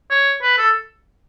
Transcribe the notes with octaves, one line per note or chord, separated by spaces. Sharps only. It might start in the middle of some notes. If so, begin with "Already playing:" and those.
C#5
B4
A4